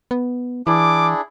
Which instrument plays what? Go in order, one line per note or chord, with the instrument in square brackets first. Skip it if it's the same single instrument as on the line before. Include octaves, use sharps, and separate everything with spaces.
[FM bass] B3
[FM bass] E3 [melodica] D4 E4 G#4 [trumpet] D6